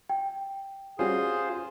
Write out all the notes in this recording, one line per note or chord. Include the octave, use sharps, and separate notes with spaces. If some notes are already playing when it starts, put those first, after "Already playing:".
G5
G3 C#4 F4 F#4 G#4 C5